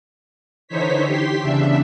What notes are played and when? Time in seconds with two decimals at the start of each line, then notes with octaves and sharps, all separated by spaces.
0.68 D3 E3 D#4 C5 C#5 B6
1.06 G4 C6 B6
1.41 E2 C#3 D4 E5